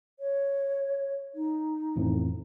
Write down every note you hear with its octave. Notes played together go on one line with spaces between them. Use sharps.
C#5
D#4
A1 F2 A2